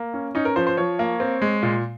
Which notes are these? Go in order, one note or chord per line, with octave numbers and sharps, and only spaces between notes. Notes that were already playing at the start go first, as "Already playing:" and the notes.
Already playing: A#3
C#4
C#4 D#4
A#4
F3 C5
C5
F3 C#5
A#3
C4
G#3
A#2